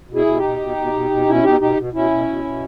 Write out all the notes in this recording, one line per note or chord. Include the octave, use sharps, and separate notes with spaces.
B2
E4 G#4
B2
D#4 G4
B2
B2
B2
B2
B2
B2 C#4 E4
B2 D#4 G4
B2 D#4 G4
B2
B2 C#4 E4
B2
B2
B2